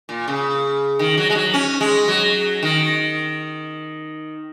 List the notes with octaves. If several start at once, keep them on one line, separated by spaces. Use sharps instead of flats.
A#2
C#3
D#3
F#3
G#3
F#3
C#4
G#3
F#3
D#3